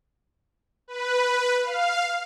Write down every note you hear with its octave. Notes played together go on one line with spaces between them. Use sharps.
B4
F5